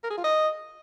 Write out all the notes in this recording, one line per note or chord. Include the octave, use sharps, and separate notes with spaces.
A#4
G#4
F4
D#5